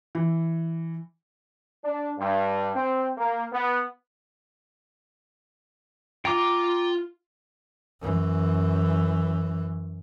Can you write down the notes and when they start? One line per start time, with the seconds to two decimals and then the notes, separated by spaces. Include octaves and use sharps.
0.15 E3
1.84 D4
2.18 G2
2.75 C4
3.18 A#3
3.53 B3
6.25 F4 G5 A#5 C6 D6
8.00 F#2 E3